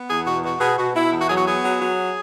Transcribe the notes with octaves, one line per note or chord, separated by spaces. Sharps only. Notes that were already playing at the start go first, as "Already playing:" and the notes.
Already playing: B3
E2 G#4
B2 F#4
B2 F#4
B2 G#4
B2 F#4
B2 E4
E2
F#4
F#3 G#4
F#4
B3 G#4
F#3
F#3